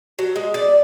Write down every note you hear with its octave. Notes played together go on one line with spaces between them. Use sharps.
F#3
G#3
D5